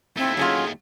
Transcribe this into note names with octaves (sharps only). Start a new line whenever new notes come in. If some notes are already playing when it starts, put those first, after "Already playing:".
D#2 A3 C4 E4
F#3 C#4 F4 G#4